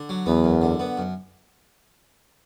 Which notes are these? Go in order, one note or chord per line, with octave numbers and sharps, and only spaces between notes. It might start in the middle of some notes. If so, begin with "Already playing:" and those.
Already playing: D3
F#3
E2 B3
F#2
D3
B3
F#2